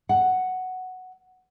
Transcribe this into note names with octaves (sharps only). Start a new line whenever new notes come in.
F#5